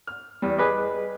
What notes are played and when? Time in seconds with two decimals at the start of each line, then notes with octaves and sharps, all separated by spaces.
0.07 F6
0.42 E2 G3
0.58 G#4 B4 D#5 D6